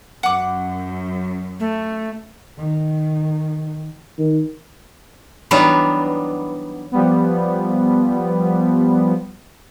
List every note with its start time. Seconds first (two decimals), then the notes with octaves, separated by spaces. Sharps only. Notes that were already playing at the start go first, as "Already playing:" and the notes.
0.23 F#2 F#5 D6
1.60 A3
2.58 D#3
4.18 D#3
5.51 E3 F#3 G3 B3 D4 D#4
6.92 F3 G3 B3